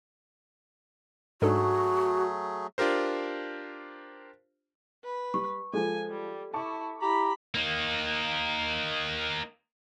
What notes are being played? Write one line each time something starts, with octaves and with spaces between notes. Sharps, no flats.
G#2 F#3 A3 D4 F#4 G#4 A4
D4 F4 G4 A#4 C5
B4
G3 C#6
F3 G#3 A4 G#5
G3
E4 A5 C#6 D6
E4 G4 A#5 B5
A#3 D#4